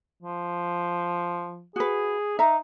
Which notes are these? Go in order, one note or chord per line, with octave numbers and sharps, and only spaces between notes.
F3
F#4 G#4 B4
D#4 E5 A#5